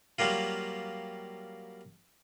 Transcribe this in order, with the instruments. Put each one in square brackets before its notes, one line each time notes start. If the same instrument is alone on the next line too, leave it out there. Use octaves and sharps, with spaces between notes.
[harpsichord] F#3 G3 A#3 F4